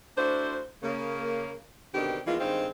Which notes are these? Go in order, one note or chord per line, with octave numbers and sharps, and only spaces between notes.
A3 D4 E4 F#4 C5
C#3 A#3
B2 D3 D#3 C4 D4 G4
D#3 E3 G#3 A#3 B3 F4
G2 D#3 G#3 C4 C5 F5